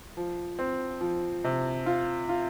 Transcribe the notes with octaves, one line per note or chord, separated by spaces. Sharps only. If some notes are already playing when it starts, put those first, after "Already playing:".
F3
C4
F3
C3
F4
F4